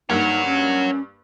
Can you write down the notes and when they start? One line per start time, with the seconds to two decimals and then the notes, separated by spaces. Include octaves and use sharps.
0.10 G2 A#3 D#4 C#5 F#5
0.46 C#4